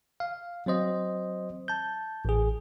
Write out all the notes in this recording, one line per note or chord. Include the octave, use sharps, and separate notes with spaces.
F5
F#3 C4 C5 D#5
A5 G6
A1 G#4